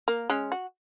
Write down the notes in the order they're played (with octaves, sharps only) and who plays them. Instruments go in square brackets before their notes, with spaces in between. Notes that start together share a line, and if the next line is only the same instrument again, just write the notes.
[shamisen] A#3
G#3 C#4
F#4